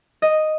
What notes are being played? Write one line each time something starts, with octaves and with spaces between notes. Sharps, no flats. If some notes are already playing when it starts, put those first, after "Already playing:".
D#5